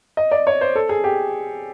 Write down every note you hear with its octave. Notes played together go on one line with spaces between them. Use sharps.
D#5
D5
C#5
C5
A4
G#4
G4